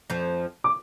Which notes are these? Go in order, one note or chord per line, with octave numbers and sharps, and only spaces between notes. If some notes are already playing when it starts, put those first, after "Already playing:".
F2 F3
D6